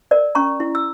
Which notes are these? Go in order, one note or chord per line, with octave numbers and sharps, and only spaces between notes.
A#4 D5
C#4 A#5 C#6
E4
E6